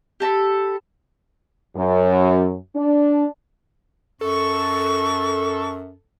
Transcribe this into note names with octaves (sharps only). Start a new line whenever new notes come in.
G4 A4 A#5 B5
F#2
D4
F#2 A4 C#6